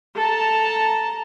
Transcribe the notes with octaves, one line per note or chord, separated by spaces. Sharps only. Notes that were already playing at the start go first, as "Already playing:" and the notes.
A4 A5 A#5